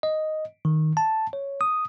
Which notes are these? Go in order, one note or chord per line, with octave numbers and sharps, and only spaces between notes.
D#5
D#3
A5
C#5
D#6